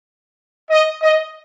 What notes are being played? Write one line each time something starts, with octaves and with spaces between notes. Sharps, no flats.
D#5
D#5